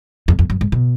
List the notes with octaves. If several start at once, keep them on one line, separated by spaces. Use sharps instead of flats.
F2
F2
F#2
G#2
B2